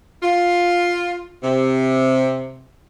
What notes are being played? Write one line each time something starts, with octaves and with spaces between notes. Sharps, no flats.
F4
C3